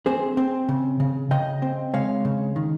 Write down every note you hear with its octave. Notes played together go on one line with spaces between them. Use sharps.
C4 G#4 C5
C4
C#3
C#3
C#3 D#5 G5
C4
G#3 C#5 F5
C#3
D#3